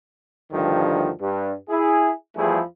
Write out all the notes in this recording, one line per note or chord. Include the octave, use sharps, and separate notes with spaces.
D2 G2 D3 D#3 F3
G2
E4 G#4
E2 F3 G3 A3 E4 G#4